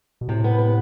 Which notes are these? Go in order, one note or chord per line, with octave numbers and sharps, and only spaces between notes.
B2
A2 C3
B3
B3